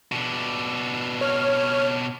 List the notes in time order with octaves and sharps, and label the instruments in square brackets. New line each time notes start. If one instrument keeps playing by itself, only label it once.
[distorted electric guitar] B2 D4
[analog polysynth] C#5 F6